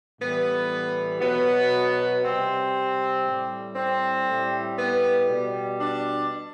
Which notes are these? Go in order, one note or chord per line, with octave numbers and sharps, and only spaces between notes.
A2 E3 G3 B3
B2 F#3 B3
C3 G3 C4
A2 G3
C4
A2 G3
B3
B2 G3
D4